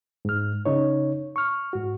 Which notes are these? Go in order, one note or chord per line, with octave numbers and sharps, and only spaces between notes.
G#2 F6
C#3 D#4 C#5
C#6 F6
G#2 F#4